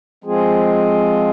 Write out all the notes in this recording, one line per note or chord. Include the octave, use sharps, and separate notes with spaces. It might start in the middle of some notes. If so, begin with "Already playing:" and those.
F3 G#3 C4 F4 G#4